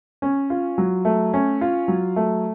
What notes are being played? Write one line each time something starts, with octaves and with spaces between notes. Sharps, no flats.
C#4
F4
F#3
A3
C#4
F4
F#3
A3